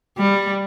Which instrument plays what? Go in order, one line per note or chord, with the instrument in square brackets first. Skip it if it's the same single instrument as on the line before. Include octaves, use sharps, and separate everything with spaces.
[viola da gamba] G3